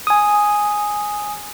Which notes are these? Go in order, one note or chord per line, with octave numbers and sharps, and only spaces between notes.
G#5 D#6